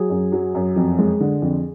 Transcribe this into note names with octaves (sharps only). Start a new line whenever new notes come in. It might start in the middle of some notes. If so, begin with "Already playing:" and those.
Already playing: F#3 G#4
F#2
F#3
F#2
F2
G#3
D3
F2